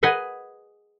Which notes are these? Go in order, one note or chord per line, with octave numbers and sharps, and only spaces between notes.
G#4 B4 D#5 F#5 G#5